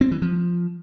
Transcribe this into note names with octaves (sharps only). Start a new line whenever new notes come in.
C4
E3
F3